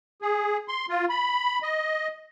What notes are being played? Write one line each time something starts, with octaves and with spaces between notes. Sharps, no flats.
G#4
C6
F4
B5
D#5